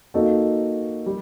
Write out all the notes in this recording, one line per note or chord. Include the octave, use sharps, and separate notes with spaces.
A#3 D#4 F#4 A4
G3